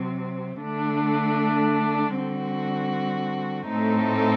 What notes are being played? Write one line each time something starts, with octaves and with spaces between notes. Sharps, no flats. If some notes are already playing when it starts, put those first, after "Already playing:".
Already playing: C3 F#3 C4
D3 A3 D4
D3 G3 C4 F#4
A2 A3 C4 D#4 A4